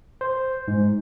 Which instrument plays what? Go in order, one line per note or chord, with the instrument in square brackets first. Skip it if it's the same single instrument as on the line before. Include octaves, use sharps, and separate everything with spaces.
[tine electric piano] C5
G#2